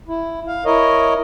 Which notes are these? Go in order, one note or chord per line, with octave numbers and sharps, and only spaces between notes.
E4
F5
E4 A#4 C#5 D#5